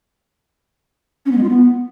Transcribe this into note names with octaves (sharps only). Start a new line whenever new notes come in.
C#4
B3
G#3
F4
B3